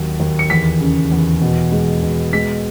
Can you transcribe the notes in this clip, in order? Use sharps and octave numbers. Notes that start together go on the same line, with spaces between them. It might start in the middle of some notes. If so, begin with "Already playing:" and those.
Already playing: D#2 F#3
D#2
C#7
E2 B6
C#3
E2
B2
G#3
B2
G#3 B6